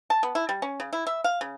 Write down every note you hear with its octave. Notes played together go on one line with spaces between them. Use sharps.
A5
B3
E4
G3
C#4
C#3
E4
E5
F5
C#3